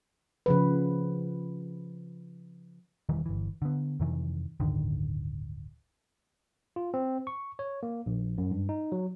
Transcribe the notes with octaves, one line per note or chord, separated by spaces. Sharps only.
C#3 F3 B4
E1 D#3 E3 G3
G1 E3
D3 B3
F2 C3 D#3 E3
D1 G1 D3 D#3
F4
C4
C#6
C#5
A#3
A#1
F#2
G2
D#4
F#3